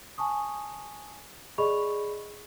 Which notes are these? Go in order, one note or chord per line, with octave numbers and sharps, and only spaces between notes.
G#5 A5 C#6 D#6
G#4 D5 D#5 B5 C#6 F7